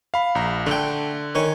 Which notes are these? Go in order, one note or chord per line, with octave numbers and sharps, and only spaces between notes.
F5 B5
A#1 A#5
D3 A3 G5
D#3 C#5 G#5